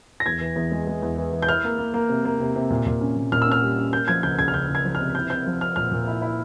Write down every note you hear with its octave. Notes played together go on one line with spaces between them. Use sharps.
A#6
E2 G#6
E3
E2
G#3
G#3
E2
E3
E3
G6
E4 F6
A#3
A#3
A#3
C3
A#3
C3
C3
A#2
A#2
C#4
A#2
A#2 F6
E6
C#4 F6
G3
C#4
A#3 G6
F3 G#6
C#2 G6
C#2 G#6
F6
C#2 G6
C#2
G#6
F3
F6
C3
E4 G6
C4 G6
F3
C4 F6
A#2 F6
A#2
E4
E4